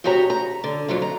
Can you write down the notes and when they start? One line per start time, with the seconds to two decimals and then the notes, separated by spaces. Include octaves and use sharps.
0.04 G#2 C#3 F#4 G4 C#5 A#5
0.30 A#5
0.64 D3
0.88 F2 G#2 F#3 F4
1.02 A#5